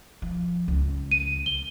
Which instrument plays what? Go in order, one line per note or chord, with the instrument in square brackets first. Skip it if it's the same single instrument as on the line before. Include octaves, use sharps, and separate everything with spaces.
[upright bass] F3
C#2
[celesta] D#7
G7